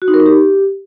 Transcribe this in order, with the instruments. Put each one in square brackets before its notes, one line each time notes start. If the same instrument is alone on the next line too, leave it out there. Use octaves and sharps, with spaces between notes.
[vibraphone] F#4
D#4
A#4
D#4
G4